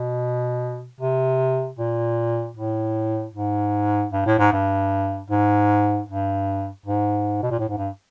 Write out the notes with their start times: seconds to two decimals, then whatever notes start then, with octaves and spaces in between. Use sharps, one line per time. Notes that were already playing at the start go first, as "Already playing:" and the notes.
Already playing: B2
1.00 C3
1.79 A#2
2.57 A2
3.35 G#2
4.13 G2
4.26 A2
4.39 G#2
4.53 G2
5.30 G#2
6.09 G2
6.86 G#2
7.43 B2
7.51 A#2
7.59 A2
7.69 G#2
7.78 G2